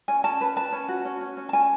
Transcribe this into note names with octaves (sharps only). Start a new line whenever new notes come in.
C#4 G#5
C#4 A5
B4
B4 A5
C#4
F#4
C#4
C#4
C#4
A5
C#4 G#5